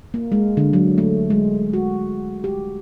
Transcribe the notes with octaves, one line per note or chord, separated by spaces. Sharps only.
A#3
G#3
D3
F#3
A3
G#3
F#4
G4